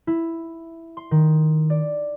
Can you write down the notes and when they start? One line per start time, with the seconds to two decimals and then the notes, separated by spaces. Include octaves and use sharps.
0.07 E4
0.97 C6
1.11 D#3
1.70 D5